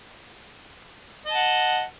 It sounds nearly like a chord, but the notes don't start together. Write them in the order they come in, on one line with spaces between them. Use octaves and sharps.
D#5 A5 F#5